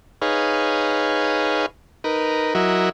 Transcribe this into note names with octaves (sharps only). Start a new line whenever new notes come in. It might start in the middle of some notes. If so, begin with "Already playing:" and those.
D#4 G#4 B4 C#5 F5
D#4 A#4 B4
F#3 E4 F#4 A#4 D#5 E5